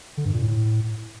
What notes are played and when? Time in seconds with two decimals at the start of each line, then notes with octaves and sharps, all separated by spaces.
0.17 D3
0.25 G2
0.33 A#2
0.42 A2